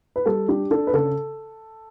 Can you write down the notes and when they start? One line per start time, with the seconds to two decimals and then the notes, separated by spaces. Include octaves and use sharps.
0.16 B4
0.26 G3 A4
0.48 D4 G4
0.71 D4 A4
0.87 B4
0.93 C#3 A4